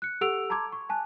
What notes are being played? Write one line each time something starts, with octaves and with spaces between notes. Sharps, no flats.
F#6 C#7
G4 A4 F#5 E6 D7 F7
A5 A#5 C6 D6 G#6
C#6
G#5 A5 F#6